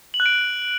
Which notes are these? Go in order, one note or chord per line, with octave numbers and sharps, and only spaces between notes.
F#7
F#6
D7